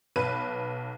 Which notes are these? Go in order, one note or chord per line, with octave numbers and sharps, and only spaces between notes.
B1 B4 D#7